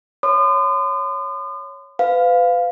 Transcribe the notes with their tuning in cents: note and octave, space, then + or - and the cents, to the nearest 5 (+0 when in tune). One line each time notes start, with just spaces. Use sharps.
C#5 +0 C6 -40 D#6 -40
B4 +35 F5 +0